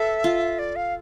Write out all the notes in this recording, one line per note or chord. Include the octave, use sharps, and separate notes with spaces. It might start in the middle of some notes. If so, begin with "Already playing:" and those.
Already playing: A4 B4 E5
F4
D5
F5